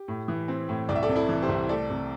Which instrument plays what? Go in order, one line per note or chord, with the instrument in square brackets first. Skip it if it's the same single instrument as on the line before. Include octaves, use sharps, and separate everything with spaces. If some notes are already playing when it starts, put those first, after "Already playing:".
Already playing: [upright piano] G4
A2
E3
C4
A2
C2 D5
E5
A4 D5
C3
E4 A4
E3 A4
G4 C5
C2
A3 A4 D5
C3